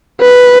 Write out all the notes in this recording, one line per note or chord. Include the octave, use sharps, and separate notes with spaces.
B4